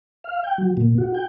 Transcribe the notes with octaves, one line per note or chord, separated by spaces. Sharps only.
F5
G5
F#3
A#2
F#4
G5